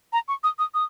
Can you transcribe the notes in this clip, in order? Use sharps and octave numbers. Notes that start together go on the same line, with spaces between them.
A#5
C#6
D#6
D#6
D#6